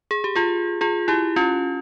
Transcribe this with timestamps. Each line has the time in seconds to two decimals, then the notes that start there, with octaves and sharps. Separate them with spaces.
0.11 G#4
0.24 G4
0.36 F4 G#4
0.81 F4 G#4
1.08 E4 G4
1.36 C#4 F4